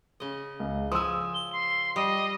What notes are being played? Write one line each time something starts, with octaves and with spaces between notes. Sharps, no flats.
C#3 D#5
C#2
F3 G#5 D#6 E6
G7
C6
G3 D#5